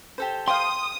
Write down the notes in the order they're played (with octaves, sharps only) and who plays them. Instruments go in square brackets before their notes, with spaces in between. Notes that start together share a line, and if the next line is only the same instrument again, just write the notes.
[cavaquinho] G4 A4 C5
[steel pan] F5 G5 [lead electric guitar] C6 [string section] D#6